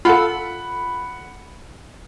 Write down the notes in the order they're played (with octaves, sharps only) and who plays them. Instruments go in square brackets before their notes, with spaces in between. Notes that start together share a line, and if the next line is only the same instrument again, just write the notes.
[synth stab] F4 A4 [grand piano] F#5 B5